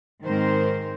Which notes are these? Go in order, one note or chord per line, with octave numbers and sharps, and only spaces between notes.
G#2 D#3 G#3 C4 A#4 C5